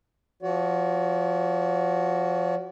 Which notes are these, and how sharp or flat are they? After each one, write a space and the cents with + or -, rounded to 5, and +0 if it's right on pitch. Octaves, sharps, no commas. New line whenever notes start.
F3 +0 F#4 +0 D5 -45